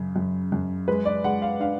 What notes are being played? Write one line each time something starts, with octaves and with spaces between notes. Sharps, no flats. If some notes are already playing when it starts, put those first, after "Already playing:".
Already playing: F#2 C#3
F#2
F#2
G#3 B4
D5
G#3 F#5
F5
D4 F5